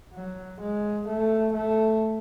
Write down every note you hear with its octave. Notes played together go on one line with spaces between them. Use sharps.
F#3
G#3
A3
A3